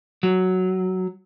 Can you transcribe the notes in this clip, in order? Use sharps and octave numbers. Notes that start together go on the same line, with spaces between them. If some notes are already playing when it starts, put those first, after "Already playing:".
F#3